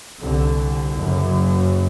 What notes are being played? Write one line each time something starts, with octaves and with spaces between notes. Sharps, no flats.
C2 D3
F#1 F#2 C#3